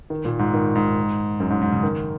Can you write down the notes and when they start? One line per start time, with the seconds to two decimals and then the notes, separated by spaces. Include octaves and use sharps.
0.10 D#3
0.25 A#2
0.39 G#2
0.54 D#3
0.75 G#2
1.40 F#2
1.50 G#2
1.61 G#2
1.72 C#3
1.83 D#3